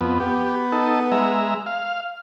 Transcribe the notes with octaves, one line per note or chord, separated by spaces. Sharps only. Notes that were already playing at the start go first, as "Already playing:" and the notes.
F2 B3
B3 G4
D#4 A4
G#3 E5 A#5
F5